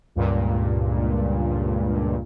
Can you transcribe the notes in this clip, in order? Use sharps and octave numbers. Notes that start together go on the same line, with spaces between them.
C#2 G2 A#2